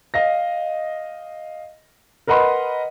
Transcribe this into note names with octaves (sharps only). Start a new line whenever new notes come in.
D#5 F5 A#6
A#4 B4 D#5 F#5 B5 C6